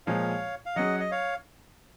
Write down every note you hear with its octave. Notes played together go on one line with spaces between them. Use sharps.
A#2 F3 G#3 C#5 F5
F5
F#3 C#4 G#4 D#5 F#5
D#5
C#5 F5